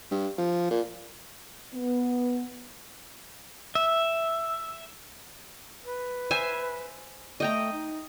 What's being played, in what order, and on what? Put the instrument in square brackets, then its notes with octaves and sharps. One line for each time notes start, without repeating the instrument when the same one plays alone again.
[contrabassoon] G2
F3
A#2
[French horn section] B3
[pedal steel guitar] E5
[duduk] B4
[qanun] C5 E5 G#5
[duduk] A3 [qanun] D#5 G5 A#5
[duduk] D#4